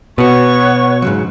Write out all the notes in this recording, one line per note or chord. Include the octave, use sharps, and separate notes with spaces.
B2 B3 F#4 C#5 F#5 C#6
G#2 C#3 F#3